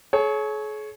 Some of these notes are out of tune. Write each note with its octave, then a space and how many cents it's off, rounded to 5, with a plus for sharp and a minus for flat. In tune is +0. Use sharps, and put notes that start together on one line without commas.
G#4 +45 C#5 +0